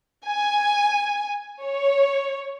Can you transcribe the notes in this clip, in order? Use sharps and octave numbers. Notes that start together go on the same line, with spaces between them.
G#5
C#5